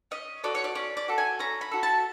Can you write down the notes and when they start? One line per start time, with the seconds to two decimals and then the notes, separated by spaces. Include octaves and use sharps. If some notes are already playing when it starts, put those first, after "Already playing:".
0.11 C#4 D#5
0.43 F#4 A4 D5
0.55 C#5
0.64 D5
0.75 C#4 D5
0.97 D5
1.08 F#4 A4
1.18 G#5
1.39 C#4 A#5
1.61 B5
1.72 F#4 A4
1.83 A5